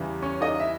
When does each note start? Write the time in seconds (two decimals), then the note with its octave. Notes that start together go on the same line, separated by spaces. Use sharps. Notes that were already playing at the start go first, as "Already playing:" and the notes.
Already playing: E2 C#3 E3 G3
0.22 C#4 C#5
0.41 D#4 D#5
0.60 E4 E5